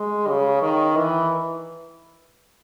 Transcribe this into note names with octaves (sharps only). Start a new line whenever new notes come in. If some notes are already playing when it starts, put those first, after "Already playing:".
Already playing: G#3
C#3
D#3
E3